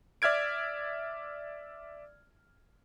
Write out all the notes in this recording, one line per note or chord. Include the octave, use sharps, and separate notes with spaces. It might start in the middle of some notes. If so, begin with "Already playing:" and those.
D5 E5 F6 G#6 D7